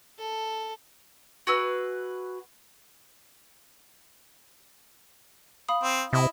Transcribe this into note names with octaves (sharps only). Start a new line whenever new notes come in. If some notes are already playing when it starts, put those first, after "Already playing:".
A4
F#4 G#4 B4 E6
F5 B5 D#6
C4
C3 E4 D#5